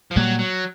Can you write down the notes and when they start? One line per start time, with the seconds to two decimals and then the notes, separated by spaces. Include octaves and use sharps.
0.11 F3
0.16 A#2 F#3 G3 A#3
0.39 F#3